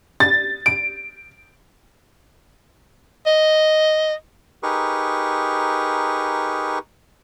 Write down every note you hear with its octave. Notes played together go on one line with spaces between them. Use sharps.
A6
D7
D#5
D#4 G4 G#4 A#4 B4 C#6